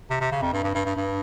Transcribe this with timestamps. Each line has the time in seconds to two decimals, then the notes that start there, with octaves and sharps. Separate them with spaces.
0.10 C3
0.21 C3
0.32 C#3
0.42 F2
0.53 G2
0.64 G2
0.75 G2
0.85 G2
0.96 G2